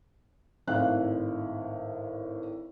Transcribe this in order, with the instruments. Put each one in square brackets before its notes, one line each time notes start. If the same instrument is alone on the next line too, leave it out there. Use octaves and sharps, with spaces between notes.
[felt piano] G#1 A2 F5 F#6